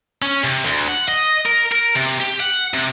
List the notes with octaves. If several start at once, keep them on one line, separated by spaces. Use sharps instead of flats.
C#4
C3
D2
F#5
D#5
A#4
A#4
C3
G4
F#5
C3